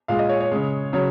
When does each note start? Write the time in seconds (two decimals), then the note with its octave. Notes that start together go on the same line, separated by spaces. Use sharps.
0.08 A#2 G#3 F5
0.19 D#5
0.29 C#5
0.41 C#5
0.51 C#3 G#3
0.93 C#3 F#3 C#5